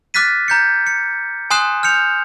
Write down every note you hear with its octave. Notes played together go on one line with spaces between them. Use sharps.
D6 F6 F#6 A6 B6 D#7
A#5 G6 C#7
C#7
G#5 C6 D#6 F#6 C7 E7
F6 G6 C#7 F7